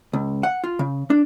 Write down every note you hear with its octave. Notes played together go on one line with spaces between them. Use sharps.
C#2
F#5
F4
C#3
D4